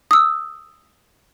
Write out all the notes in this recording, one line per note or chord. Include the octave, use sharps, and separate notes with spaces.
D#6 E6